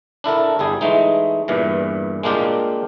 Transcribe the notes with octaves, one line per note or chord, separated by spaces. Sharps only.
D4 E4 A4 A#4
G1 G3 G#4
E3 G#3 A3 D#4
E2 G2 A#2 E3
G#3 A#3 D4 F4 G4 D5